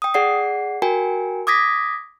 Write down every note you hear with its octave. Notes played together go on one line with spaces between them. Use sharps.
G5 D#6
G#4 D5 F#5 C7
F#4 A#4 G5 G#5
D6 D#6 G#6 A#6 B6